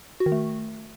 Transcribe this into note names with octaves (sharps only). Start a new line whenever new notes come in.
F#4
D#3
A3